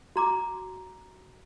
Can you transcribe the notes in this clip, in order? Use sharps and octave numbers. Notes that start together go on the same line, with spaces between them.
F#4 A#5 D6